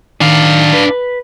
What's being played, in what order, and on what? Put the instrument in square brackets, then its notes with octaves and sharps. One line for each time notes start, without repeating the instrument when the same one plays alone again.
[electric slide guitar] D#3 [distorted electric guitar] D4 F5
[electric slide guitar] B4